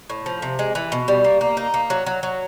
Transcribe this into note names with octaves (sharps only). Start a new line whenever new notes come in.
A2
F3
C3
G#3
E3
B2
G3
A#3
A#3
D#4
A#3
F#3
F#3
F#3